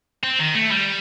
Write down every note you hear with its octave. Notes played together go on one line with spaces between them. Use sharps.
C4
D#3
A3
G3